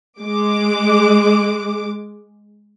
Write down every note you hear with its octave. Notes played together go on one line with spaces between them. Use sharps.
G#3 D6